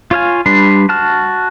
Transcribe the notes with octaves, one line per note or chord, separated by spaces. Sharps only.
F4 C#5 F5 G#5
G3 D4 B4 C6
F#4 A5 F6